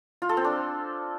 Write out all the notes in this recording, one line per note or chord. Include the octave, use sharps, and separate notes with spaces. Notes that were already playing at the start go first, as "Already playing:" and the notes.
F4
A4
C4
D4